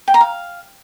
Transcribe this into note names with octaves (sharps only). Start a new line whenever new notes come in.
G5
A#5
F5